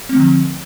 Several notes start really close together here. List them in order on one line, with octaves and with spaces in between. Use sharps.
C4 A3 D3 F3